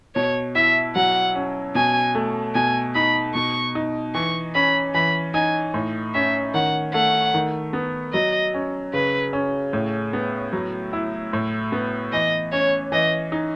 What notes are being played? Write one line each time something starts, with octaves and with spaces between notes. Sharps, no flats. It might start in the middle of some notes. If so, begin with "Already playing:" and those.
B2 C#5
E4 E5
F#3 F#5
C#4
B2 G#5
A3
B2 G#5
D#4 B5
B2 C#6
D#4
E3 C#6
C#4 B5
E3 B5
D#4 G#5
A2
C#4 E5
D#3 F#5
A3 F#5
D#3
B3
F#3 D#5
C#4
C#3 B4
C#4
A2
B3
F#3
E4
A2
B3
E3 D#5
C#4 C#5
E3 D#5
D#4